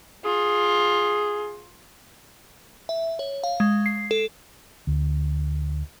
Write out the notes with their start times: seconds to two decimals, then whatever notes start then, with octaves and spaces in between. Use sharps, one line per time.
0.25 F4 G#4
2.89 E5
3.19 C#5
3.44 F5
3.60 G#3
3.86 C7
4.11 A4
4.87 D2